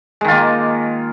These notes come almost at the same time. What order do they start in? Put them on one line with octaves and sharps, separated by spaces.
G#3 D#3 F4 A#3